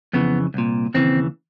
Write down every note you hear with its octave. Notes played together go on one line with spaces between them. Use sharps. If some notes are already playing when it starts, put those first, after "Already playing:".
F2 C#3 E3 B3
C2 A#2
D#2 C#3 E3 C4